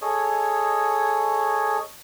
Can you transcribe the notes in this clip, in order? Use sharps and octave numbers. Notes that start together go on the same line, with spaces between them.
G#4 A4 C#5 D#5